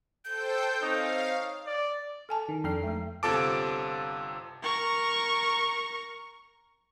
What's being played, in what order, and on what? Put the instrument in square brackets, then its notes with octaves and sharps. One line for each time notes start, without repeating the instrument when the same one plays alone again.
[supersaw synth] A4 C5 G5 [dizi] G6
[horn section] C4 D#4 C#5 [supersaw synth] F5
[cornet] D5
[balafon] A4 G#5 A5
[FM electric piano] D#3
[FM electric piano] F2 G5 C7 [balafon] D4 A4 D5
[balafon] G#3 A3
[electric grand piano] G1 C3 F4 A4 A5 D6
[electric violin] A#4 C#6